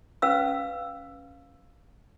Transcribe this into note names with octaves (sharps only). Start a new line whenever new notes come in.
C#4 B4 F5 E6